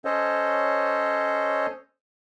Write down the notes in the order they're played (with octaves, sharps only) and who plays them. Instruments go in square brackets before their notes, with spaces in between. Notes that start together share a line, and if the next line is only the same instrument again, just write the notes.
[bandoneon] C#4 A4 C5 C#5 D#5